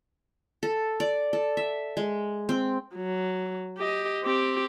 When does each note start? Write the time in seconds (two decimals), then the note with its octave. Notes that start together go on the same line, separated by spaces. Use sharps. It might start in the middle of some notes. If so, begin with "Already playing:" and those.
0.63 A4
1.00 D5
1.33 A4
1.57 E5
1.97 G#3
2.49 C4
2.95 F#3
3.78 G4 D#5
4.24 C4 G4